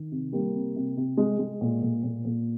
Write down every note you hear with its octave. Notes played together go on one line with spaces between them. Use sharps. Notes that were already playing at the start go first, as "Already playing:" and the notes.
Already playing: D#3
C3
G3 A#3
C3
C3
C3
G#3
G#3
A#2
A#2
A#2
A#2